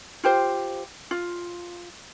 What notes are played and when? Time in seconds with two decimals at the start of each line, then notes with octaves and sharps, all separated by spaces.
0.24 F4 G4 C5
1.11 F4